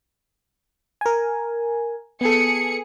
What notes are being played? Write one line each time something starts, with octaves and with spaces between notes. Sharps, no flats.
A#4 G#5
B3 G#4 A4 C#7